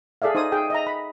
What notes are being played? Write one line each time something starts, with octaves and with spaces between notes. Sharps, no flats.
G#4 A4 D5 E5 F5
D#4 C5 G#5 D#6
G#4 G5
D#5 E5 A#5
B5